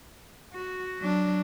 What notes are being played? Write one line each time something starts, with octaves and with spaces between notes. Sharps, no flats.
F#4
F#3 D4